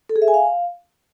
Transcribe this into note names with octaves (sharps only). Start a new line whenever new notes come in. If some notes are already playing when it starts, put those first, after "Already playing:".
A4
G#4
E5
G#5
F5